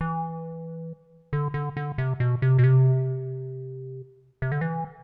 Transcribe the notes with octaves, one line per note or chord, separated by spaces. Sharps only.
E3
D3
D3
D3
C3
B2
C3
B2
C3
C3
D3
E3